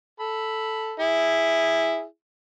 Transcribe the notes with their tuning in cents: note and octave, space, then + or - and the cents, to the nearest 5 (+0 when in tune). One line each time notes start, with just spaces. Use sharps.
A4 +0 B5 +0
E4 +0 G#4 -10